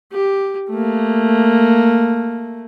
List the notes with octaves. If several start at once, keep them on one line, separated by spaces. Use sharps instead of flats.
G4
A3 A#3